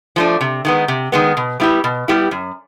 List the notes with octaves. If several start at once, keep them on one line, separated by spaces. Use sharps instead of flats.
F3 A3 D4
C3
D#3 G#3 B3
C3
D#3 G#3 B3
B2
G3 B3 E4 G4
B2
G3 B3 E4 G4
F#2